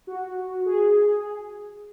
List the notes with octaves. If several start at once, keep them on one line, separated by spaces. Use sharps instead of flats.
F#4
G#4